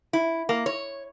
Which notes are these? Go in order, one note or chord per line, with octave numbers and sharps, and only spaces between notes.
E4
A#3
C#5